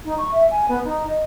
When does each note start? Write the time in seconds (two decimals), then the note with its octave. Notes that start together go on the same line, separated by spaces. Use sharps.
0.05 D#4
0.18 C#6
0.32 E5
0.51 G#5
0.68 B3
0.85 D#4
1.06 D#5